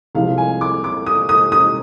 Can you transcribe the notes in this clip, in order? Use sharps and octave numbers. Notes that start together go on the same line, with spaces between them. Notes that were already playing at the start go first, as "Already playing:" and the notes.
C2 C3 F3 G#3 F5
G#5
D6
D6
D#6
D#6
D#6